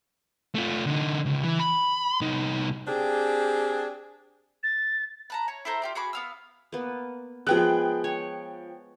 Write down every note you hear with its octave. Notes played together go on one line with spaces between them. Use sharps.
A3 F4
D3 D#4
C#2
E3
B5
C2 D#4
C4 D4 G4 G#4
A6
B4 A5 A#5
C#5
E4 A4 C5 A#5
F4 G4 D5
F#4 G#4 B5 D6
B3 F5 E6
A#3 B3
F3 G#3 B3 G#4 G5 F#6
C#5